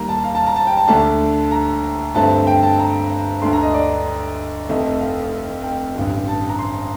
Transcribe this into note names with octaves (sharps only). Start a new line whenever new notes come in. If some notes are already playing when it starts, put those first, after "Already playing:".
Already playing: D#2 D#3 G3 A#3 A#5
A5
F5
A5
A#5
A5
G5
A5
D2 D3 A3 D4 A5
A#5
G2 D3 A3 C4 A5
G5
A5
A#5
D2 D3 A3 D4 C6
A#5
D#5
D5
F1 F2 D#3 A3 D#5
F5
G5
A1 G2 D3
A5
A#5
C6